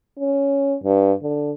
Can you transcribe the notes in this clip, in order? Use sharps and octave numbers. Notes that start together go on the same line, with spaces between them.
C#4
G2
D3